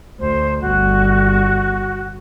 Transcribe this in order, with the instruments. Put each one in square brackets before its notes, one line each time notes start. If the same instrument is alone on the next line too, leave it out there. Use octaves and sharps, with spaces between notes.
[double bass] D2 [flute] C5
[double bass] G1 [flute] F#4